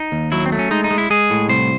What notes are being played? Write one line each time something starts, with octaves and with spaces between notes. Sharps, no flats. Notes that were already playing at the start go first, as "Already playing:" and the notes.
Already playing: D#4
D#2
F#3 E4
C4
A3
C#4
G#3 D#4
D#4
G#3
E4
G#3 G#4
A2
C2 C5